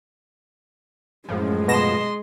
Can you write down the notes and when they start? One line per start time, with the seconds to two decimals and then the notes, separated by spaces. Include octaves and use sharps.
1.29 F#2 A2 F3 G#3
1.68 B2 D#5 C6 A#6 E7